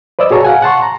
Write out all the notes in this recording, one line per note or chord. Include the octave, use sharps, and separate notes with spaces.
B4 C5 D5 D#5 E6
F#4 G#4 C#5 A5 A#5
F5 F#5 G#5
F#5 A5 C6 C#6
A#5